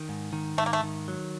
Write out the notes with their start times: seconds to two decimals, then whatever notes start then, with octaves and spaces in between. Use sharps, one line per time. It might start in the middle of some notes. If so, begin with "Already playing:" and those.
Already playing: D#3
0.09 G#2
0.33 D#3
0.58 G#2 A3
0.66 A#3
0.73 A3
0.84 D#3
1.08 F#3